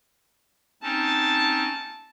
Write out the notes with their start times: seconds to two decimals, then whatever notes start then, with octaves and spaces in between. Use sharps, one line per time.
0.83 C4 C#4 D#4 A5